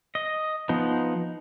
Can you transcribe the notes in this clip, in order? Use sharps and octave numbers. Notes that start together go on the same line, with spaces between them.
D#5
F3 B3 D#4